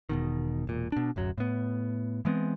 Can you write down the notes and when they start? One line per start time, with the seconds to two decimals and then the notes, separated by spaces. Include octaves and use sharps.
0.09 E1 B2 D#3
0.67 E1 A#2
0.92 B2 D4
1.16 D1 F#2 F#3
1.38 A2 B3
2.25 E3 G#3 B3 C4